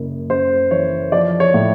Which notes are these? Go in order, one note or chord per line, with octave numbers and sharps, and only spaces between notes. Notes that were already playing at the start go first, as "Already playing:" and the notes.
Already playing: F#1 F#2
C#3 C5
E3 C#5
F3 D5
C#5
A2